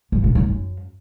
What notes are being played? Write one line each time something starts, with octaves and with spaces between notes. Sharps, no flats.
G#2
A#2
D#3
F#2